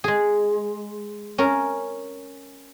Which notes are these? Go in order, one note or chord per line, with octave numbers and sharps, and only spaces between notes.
G#3 G#4
C#4 A#4